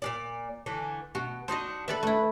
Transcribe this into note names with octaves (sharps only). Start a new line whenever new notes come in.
A#2 G#3 D5
D3 E3 A3
B2 F#4
D4 D#4 F#4 C5 D#5
A4 B4 D5 E5
A3 E4